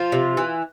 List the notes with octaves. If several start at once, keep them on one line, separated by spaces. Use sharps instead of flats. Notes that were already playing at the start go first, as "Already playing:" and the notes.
Already playing: F3 F4
C3
E3